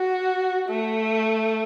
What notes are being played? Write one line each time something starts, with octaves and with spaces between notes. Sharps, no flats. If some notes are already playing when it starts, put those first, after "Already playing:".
Already playing: F#4
A3